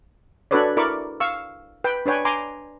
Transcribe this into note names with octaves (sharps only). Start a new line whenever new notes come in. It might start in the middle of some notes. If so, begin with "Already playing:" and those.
D4 F#4 A4 B4 C#5 D5
E4 A#4 D5 B5 C#6 D6
F5 C#6 E6
B4 G5
D4 B4 C#5 G5 G#5
G#5 A#5 C6 D6